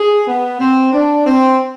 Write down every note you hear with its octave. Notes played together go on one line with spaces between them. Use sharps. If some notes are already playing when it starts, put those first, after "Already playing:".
Already playing: G#4
B3
C4
D4
C4